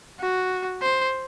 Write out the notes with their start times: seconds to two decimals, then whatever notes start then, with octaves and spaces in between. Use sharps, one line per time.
0.20 F#4
0.82 C5